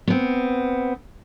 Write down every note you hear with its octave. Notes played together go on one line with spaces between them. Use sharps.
B3 C4